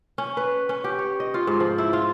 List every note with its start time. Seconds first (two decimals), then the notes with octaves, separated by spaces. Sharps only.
0.18 C#4
0.37 B4
0.69 C#4
0.84 G4
0.99 C#5
1.20 D#5
1.34 F4
1.47 G#2
1.60 F3
1.78 E4
1.93 F4